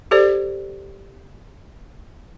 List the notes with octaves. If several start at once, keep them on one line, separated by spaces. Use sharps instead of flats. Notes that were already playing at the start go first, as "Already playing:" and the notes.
G4 A4 C5 D5